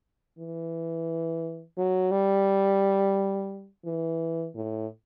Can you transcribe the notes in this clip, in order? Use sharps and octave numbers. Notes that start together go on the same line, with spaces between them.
E3
F#3
G3
E3
A2